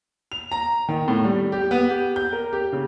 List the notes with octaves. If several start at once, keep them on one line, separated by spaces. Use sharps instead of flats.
F7
A#5
D#3
A2
G3
G4
B3
G4
G6
A#4
G4
C#3